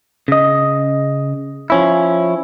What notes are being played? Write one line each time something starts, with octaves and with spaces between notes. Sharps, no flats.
C#3 D#5
F3 C#4 E4